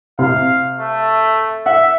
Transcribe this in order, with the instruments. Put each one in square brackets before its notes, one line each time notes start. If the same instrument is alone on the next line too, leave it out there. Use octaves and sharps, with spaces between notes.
[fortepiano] C3 [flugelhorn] F5
[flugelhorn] A3
[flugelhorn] E5 [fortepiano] F#5